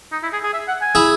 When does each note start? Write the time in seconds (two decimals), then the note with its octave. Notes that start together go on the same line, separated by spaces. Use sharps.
0.12 D#4
0.23 E4
0.33 G#4
0.43 G#4
0.53 E5
0.68 F#5
0.81 G#5
0.95 E4 G#4